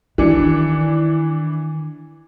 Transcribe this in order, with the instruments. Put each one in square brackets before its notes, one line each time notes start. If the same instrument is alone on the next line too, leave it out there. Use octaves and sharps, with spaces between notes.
[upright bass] D#3 [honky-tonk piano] E3 D4 C#7